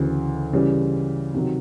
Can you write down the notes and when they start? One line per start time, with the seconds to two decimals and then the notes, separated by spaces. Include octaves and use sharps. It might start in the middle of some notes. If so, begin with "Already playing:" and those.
Already playing: D2 C#3 E3
0.53 C#3 E3 G3
1.34 C3 D#3 F#3